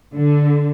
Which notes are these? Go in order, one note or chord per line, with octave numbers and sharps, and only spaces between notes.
D3